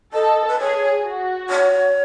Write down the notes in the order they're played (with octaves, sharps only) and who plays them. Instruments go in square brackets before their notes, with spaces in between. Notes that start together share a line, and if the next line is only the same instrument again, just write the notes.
[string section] A4 [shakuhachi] D#5
[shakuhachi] B4
[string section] G#4 [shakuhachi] C#5
[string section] F#4
[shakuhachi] C#5